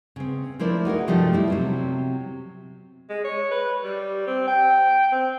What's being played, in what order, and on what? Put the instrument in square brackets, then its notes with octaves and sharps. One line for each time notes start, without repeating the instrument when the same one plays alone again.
[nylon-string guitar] C#3 C4
F3 A3 E4 A#4 C5 D5
D#4 F#4 G#4 A#4
G2 C3 F3 A3 G4 D#5
G3 E4
C3 F#3 C4
[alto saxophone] G#3
C#5
B4
G3
C4
G5
C4